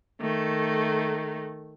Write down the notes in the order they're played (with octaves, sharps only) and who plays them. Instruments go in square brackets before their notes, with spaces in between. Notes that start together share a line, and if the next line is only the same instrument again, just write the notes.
[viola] D#3 A3